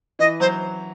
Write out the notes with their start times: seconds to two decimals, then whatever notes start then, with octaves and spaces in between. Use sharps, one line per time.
0.19 E3 D#5
0.40 F#3 C5